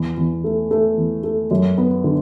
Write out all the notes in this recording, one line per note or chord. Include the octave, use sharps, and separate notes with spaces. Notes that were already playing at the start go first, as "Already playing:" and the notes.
Already playing: E2
E2
A3
A3
E2
A3
F#2
B3
D3